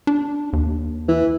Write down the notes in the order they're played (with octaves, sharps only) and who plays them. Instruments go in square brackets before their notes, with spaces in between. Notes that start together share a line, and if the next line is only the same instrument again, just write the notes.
[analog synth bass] D4
D#2
[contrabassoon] E3